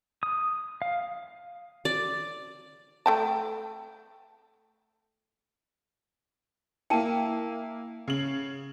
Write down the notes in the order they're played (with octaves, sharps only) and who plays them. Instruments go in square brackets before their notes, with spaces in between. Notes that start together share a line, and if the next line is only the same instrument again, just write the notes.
[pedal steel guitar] D#6
F5
[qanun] D5
[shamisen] A3 G5 A5
[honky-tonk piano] A#3 E4 [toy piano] G5 A5
[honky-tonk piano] C#3 F#7